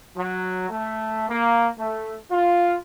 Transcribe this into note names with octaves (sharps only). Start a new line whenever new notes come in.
F#3
A3
A#3
A3
F4